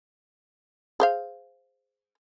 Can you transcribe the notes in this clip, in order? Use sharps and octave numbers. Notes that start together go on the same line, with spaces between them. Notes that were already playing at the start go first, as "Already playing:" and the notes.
G#4 C5 F5